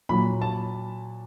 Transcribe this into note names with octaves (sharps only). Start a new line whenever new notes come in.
A#2 F#3 B5
A5